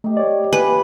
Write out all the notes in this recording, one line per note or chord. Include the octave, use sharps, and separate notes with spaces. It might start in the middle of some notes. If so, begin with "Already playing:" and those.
A3 D#4 G4
C#5 D5
A#3 B4 G#5